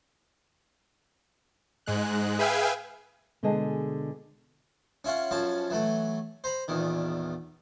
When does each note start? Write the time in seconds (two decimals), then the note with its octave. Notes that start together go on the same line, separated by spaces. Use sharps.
1.86 G#2 G#3 F#6
2.39 G#4 B4 E5 F5 G5 G#5
3.43 B2 D3 G#3 G#4 D#5 A5
5.04 C#4 E4 F4 F#5
5.31 F#2 F3 C#4 A5
5.70 E3 F#3 A3
6.44 C5 A#5 B5
6.68 A#1 E2 D#3